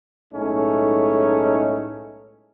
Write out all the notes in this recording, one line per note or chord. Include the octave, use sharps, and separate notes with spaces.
B1 A2 G#3 A3 C#4 D#4